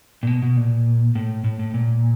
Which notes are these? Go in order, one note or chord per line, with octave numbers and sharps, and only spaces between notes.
A#2
B2
B2
A#2
A2
A2
A2
A#2